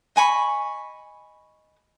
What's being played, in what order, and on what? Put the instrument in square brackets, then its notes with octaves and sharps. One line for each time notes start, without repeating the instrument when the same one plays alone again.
[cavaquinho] D#5 G#5 B5 C#6